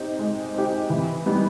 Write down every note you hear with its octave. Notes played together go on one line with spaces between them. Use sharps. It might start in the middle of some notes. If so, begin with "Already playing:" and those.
Already playing: C4 D#4 G4
G#3
C4 D#4 G4
E3
G3 B3 D#4 G4